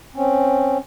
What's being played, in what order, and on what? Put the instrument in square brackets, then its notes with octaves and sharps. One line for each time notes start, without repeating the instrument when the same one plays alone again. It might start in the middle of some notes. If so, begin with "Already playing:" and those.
[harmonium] C4 C#4